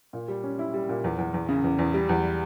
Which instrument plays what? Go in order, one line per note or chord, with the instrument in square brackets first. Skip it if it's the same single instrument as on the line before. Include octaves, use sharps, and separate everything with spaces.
[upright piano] A#2
G3
C#4
E4
G3
A#2
E2
E2
E2
C#3
E2
E2
G3
E2